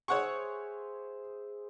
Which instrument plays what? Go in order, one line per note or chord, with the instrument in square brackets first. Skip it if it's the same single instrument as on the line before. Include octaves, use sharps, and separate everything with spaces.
[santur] G#4 C5 E5 [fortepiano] C#5 F#5 C#6